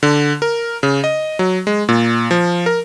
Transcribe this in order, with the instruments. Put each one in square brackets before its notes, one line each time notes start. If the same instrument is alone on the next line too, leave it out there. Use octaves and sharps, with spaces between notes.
[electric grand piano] D3
A#4
C#3
D#5
F#3
G#3
A#2
F3
A#4